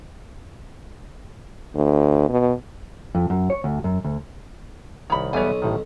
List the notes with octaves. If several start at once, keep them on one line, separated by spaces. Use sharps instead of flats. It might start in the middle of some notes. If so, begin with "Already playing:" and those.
D2
B2
F2
F#2
C#5
D2
F#2
D2
C2 D#3 C#5 B5
B1 E2 G3 B3 C#5 G#5
A1 A2 D#3